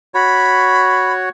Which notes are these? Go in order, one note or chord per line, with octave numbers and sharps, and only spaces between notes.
F#4 C#5 B5